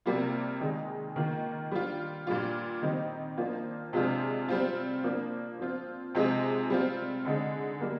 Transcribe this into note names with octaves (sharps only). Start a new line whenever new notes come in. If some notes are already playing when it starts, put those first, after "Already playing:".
C3 G3 A#3 F4
D#3 G#3 D#4
D#3 A#3 F4
G3 D4 F4
A#2 G3 D4 F4
D#3 G3 C4 D#4
F3 A#3 D4 F4
C3 F3 G#3 D4 F4
G3 C4 F4
F3 A#3 D4
F3 C4 F4
C3 F3 G#3 D#4
G3 C4 F4
D3 G#3 D#4
G3 A#3